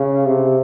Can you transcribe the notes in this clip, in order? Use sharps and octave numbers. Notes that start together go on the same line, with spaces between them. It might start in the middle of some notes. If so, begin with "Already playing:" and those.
Already playing: C#3
C3